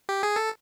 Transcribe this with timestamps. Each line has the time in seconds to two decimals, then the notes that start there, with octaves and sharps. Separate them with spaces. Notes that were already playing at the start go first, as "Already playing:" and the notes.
0.09 G4
0.23 G#4
0.36 A4